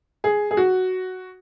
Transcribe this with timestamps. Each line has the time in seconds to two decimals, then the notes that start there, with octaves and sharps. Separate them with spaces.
0.24 G#4
0.51 G#4
0.57 F#4